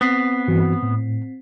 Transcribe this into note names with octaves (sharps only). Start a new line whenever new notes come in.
B3 C4 B6 C7
G2 E3 F#4
A2